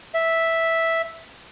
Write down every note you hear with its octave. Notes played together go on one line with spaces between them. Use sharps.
E5